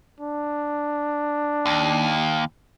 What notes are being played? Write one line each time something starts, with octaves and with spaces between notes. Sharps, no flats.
D4
D#2